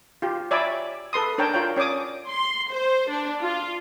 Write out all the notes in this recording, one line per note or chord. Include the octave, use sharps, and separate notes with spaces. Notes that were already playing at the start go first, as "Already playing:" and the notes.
F4 G4
C#5 D5 E5 G#5 B5 D6
A4 B4 C6 D#6
D4 A#4 C#5 G5 A5
F4 A#4 C#5 G5
C#4 C#5 D5 D6 D#6
C6
C5
D4
F4